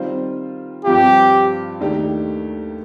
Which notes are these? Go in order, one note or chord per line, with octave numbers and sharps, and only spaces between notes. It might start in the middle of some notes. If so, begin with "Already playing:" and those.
Already playing: D#3 G3 C4 F4 C5
G2 F3 C4 F4 G4
D#2 D#3 A3 D4 G4